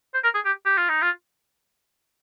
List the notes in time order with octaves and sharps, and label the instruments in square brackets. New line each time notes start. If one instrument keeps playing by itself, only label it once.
[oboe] C5
A#4
G#4
G4
G4
F4
D#4
F4